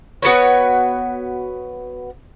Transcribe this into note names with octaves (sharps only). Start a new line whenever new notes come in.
B3 F#4 B4 C#5